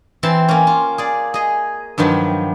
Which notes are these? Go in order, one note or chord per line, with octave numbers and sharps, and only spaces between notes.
E3 C4 G5 A5 C6
A#3 C#4
F4
G#4 D5
G#4 D#5
G2 D#3 F3 F#3